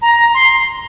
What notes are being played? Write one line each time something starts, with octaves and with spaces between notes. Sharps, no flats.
A#5
C6